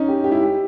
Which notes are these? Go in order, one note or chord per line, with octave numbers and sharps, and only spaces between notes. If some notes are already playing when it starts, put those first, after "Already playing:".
Already playing: C#4 D#4
G4
G4
E4
G4